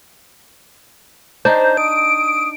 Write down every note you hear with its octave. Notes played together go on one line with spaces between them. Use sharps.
D4 D#4 C5 A#5
D#6 D7